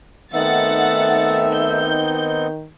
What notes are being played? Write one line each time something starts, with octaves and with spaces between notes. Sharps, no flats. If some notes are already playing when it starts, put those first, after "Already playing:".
D#3 A3 B3 C4 D#4 E5 F#5 A6
G6